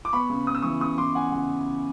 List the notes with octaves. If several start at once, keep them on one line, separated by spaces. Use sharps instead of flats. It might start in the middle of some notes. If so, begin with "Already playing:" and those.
D6
B3 B5 C#6
C#3
B3 D#6
E6
E3 C#6 D#6
C#3 C#6 D#6
E3 C6 D6
B3 F#5 G#5
C#3 F#5